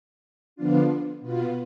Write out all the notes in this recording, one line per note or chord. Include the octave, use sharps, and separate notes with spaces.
D3 F3 B3 D4 F4
B2 B3 F4